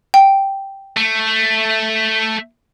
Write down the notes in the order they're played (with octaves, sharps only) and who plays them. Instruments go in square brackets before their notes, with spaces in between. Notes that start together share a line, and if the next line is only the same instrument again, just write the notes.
[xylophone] G5
[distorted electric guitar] A3